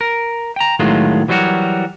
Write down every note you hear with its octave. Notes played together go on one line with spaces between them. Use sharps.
A#4
G5 A#5
A2 D#3 F#3 G#3 F4
E3 F#3 G3 D#4 F#4 A#4